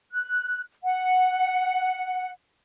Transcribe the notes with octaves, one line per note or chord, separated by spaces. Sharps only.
F#6
F#5